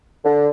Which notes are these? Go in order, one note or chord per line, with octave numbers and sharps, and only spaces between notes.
D3